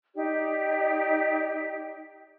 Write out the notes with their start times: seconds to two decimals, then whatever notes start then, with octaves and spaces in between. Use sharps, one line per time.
0.15 D#4 G4 D5